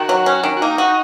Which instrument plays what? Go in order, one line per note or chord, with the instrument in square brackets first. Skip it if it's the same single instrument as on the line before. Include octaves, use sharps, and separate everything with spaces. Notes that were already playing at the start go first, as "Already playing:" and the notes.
Already playing: [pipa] D#3 [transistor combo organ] F#4
[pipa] F#3
C#4
D#3
[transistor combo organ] F#4
[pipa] A#3 [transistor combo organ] D#4
[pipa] F#4